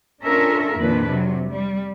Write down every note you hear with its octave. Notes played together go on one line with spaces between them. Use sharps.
C#4 D4 F4 A4 A#4 E5
F2 A#2 D#3 D4 B4
C3 F#3
G3